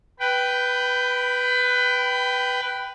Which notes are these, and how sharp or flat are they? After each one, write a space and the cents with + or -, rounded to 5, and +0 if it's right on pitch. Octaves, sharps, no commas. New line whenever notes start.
B4 +0 G5 -10 B5 +25